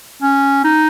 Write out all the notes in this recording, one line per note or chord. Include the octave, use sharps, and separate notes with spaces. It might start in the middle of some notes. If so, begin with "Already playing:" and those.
C#4
D#4